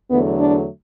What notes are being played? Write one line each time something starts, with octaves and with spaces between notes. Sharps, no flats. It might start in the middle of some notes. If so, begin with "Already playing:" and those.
E2 D3 F#3 A3 B3
D4